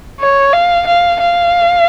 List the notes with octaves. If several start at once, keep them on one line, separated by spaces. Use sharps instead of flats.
C#5
F5
F5
F5